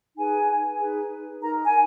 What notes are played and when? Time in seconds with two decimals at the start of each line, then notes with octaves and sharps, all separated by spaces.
0.16 D#4 G#4 B4 G#5
0.79 D#4 G#4 B4
1.41 D#4 A#4 A#5
1.65 G#5